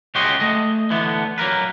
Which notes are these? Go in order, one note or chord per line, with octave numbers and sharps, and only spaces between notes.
C#2 C#3 F#4 G4 D#5 C6
A3 D#5
D3 E3 A3 B3
F#3 A#3 A#4 B4